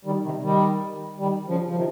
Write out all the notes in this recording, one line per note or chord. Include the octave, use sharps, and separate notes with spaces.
D#3 G3
C3 D#3
D#3 G3
D#3 G3
C#3 F3
F3
C3 D#3